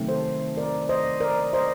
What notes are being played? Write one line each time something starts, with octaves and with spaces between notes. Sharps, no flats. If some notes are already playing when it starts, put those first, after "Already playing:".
Already playing: C3 D#3 F#3 A3 C4
A4 C5
A#4 D5
C5 D#5
A#4 D5
C5 D#5